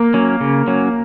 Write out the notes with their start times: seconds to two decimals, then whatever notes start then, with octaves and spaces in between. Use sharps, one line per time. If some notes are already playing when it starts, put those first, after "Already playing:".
Already playing: A#3
0.14 F#3 C#4
0.41 C#3
0.67 F#3 C#4